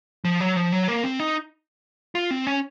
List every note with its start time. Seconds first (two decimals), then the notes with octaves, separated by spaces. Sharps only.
0.25 F3
0.41 F#3
0.56 F3
0.72 F#3
0.88 A#3
1.04 C4
1.20 D#4
2.15 F4
2.31 C4
2.47 C#4